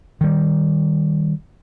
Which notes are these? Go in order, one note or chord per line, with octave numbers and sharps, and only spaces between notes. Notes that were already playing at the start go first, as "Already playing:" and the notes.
D#3 G3